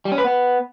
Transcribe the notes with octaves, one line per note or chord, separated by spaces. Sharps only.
G3
C#4
B4
B3